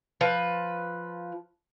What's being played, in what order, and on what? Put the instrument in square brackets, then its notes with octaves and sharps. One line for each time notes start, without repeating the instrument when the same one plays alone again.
[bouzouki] F3 B4